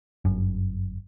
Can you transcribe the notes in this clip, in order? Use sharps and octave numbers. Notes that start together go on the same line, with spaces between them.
G1 F#2